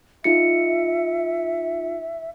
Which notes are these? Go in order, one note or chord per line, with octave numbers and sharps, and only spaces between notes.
D#4 F4 E5 C#7